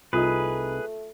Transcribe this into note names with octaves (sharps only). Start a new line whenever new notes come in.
C2 A3 D#4 F4 G#4 B4